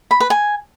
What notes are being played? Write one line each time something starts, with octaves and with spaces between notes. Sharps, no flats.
B5
B4
G#5